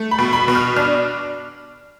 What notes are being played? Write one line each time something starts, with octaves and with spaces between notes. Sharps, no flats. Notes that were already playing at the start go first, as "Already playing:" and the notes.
Already playing: A3
B5
B2
B5
B2
F6
D4 F6